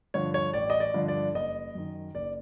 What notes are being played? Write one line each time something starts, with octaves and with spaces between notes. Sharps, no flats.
G2 D3 F3 C#5
C#5
A1 D5
D#5
D5
G2 D3 F3
D5
F#1 D#5
F#2 D#3
F#1 D5